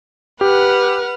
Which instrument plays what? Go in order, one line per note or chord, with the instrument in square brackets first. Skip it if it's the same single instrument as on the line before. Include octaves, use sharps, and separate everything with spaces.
[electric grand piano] G4 [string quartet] B4 F#5 F6